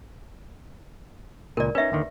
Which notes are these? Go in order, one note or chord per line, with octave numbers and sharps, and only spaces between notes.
C#2 A#2 A#4 D5
C#4 D#4 B4 E5
D#2 D3 D#3